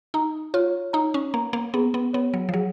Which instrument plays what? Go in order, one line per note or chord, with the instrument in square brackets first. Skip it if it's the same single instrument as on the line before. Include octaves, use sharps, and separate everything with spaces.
[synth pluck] D#4 [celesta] A#5
[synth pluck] F4 [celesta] C#5
[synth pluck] D#4 [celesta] A#5
[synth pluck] C#4
[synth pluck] A#3 [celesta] A#5
[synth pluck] A#3
[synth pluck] B3 [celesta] G#4
[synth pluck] B3
[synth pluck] B3 [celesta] C#5
[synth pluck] F#3
F3
[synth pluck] F#3 [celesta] G#4